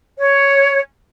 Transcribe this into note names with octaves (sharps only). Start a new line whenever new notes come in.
C#5